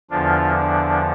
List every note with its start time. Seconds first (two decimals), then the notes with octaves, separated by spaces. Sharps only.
0.10 E2 D3 F3 D4 F4
0.57 D4